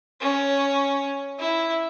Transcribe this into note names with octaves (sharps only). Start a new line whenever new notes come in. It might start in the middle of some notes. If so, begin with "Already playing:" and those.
C#4
E4